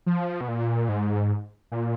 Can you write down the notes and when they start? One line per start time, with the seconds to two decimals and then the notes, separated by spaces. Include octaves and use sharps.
0.06 F3
0.41 B2
0.48 A#2
0.89 G#2
1.72 A#2